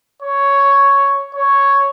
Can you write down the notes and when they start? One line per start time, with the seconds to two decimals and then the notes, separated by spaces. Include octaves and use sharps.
0.22 C#5
1.34 C#5